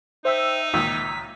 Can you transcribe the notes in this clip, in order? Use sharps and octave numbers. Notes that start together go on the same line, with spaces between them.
D#4 C5 E5 G5 E6
C#2 A#2 D#3 E6 B6